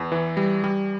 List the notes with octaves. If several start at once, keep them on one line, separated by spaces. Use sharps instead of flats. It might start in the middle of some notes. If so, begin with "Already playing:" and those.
Already playing: E2
E3
G3
G3